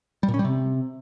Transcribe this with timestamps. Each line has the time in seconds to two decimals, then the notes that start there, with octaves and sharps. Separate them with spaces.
0.23 G3
0.28 A#2
0.34 C#4
0.39 G3
0.45 C3